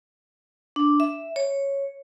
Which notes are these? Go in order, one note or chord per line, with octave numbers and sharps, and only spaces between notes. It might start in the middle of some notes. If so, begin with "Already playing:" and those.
D4
E5
C#5